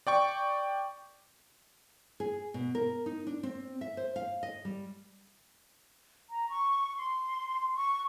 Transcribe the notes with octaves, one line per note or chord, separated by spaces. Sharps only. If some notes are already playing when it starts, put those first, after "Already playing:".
D5 G5 C#6
G#4
B2
A#4
D#4
D4
C4
E5
C5
F5
D#5
G3
A#5
C#6
C6
C#6